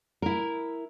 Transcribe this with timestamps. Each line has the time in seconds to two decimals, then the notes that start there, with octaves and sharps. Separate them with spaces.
0.22 E4 A#4